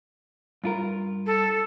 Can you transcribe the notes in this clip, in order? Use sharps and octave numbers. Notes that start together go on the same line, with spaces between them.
G2 F4 A#4
A4